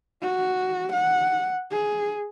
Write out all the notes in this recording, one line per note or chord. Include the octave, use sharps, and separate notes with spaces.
F#4
F#5
G#4